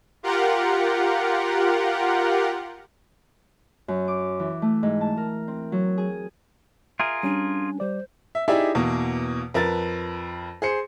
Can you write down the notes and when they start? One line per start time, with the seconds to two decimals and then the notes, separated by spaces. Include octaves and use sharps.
0.23 F4 G4 A#4 F#5
3.88 F#2
4.08 D6
4.39 E3
4.62 A3
4.83 G#2
5.01 A5
5.17 A#4
5.48 C4
5.72 F#3
5.98 G#4
7.00 F4 G#4 A#4 E5
7.23 G3 C#4 D4 G#5
7.80 G3 C5 D5
8.35 E5
8.48 D#4 E4 G4 G#4 D5 E5
8.75 E2 B2 A#3
9.54 F2 A#4 B4 A5 A6
10.62 G#4 C5 C#7